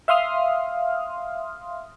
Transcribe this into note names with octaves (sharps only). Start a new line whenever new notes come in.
E5 F5 C6 D#6 F6